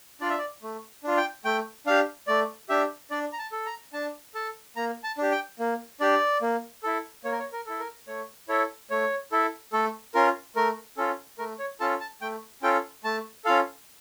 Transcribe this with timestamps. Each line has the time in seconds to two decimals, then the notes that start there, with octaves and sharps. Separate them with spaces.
0.21 D4 F4 D5
0.30 E5
0.38 D5
0.62 A3
1.04 D4 F4
1.17 G5
1.45 A3 G5
1.86 D4 G4 F5
2.27 A3 D5
2.69 D4 G4 E5
3.11 D4 D5
3.33 A#5
3.39 A5
3.52 A4
3.66 A#5
3.93 D4 A5
4.35 A4 A5
4.76 A#3 A#5
5.04 A5
5.18 D4 G4
5.32 G5
5.59 A#3
6.00 D4 G4 D5
6.42 A#3
6.83 E4 A4
7.25 A#3 C#5
7.32 A#4
7.39 C#5
7.53 A#4
7.66 E4 A4
7.80 A#4
8.07 A3 C#5
8.48 E4 A4 C#5
8.90 A3 C#5
9.32 E4 A4
9.73 A3 A4
10.14 C#4 F4 A#4
10.56 A3 A#4
10.97 C#4 F4 A4
11.38 A3 A#4
11.59 C#5
11.80 C#4 F4 A4 A5
12.00 A5
12.21 A3 G5
12.62 C#4 F4 A4 G5
13.04 A3 A5
13.45 C#4 F4 A4 F5